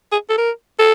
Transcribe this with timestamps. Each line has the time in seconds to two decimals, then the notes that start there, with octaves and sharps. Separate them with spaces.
0.12 G#4
0.29 A4
0.38 A#4
0.79 A4